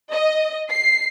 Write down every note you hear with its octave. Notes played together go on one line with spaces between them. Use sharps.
D#5
C7